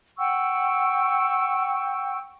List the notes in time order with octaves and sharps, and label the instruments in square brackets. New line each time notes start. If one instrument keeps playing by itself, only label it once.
[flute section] F#5 G5 C#6 E6